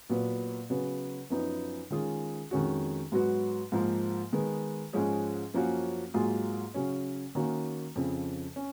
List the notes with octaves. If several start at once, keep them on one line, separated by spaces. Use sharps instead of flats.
A#2 F#3 B3
C#3 F#3 B3
F#2 F3 B3 D#4
D#3 G#3 C#4 F4 G#4
F2 D#3 G#3 C#4 F#4
G#2 F#3 B3 F#4
G#2 F3 A#3
D#3 G#3 B3
G#2 F3 G#3 C#4 G#4
F#2 F3 A#3 C#4 F#4
G#2 F#3 A#3 F4 G#4
C#3 F#3 C#4
D#3 A#3 C#4 F#4
F2 C#3 F3
C#4